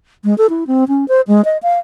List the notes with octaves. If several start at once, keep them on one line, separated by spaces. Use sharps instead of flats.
G#3
A4
E4
C4
C#4
C5
G#3
D#5
F5